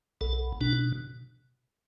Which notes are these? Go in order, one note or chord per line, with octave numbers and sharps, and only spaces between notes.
B1 A4
B2 D4